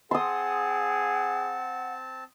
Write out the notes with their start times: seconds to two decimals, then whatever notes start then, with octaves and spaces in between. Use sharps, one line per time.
0.11 C4 G#4 F#5 A5 C6 D#6